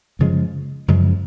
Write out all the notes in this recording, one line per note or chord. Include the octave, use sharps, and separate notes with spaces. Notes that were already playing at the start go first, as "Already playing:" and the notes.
F#2 C#3 F3 G#3
F#2 C#3 F3 G#3